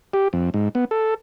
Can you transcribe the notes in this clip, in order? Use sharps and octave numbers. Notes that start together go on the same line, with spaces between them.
G4
F2
G#2
B3
A4